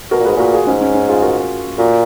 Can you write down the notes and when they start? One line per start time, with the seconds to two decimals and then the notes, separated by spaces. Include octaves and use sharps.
0.11 B2 F#4 A#4
0.20 A#2
0.25 G#2 G#4 B4
0.36 A#2 F#4 A#4
0.54 F4 G#4
0.67 G#2 C#4
0.81 C#4
0.95 C#4
1.09 F4 G#4
1.22 F#4 A#4
1.78 A#2 F#4 A#4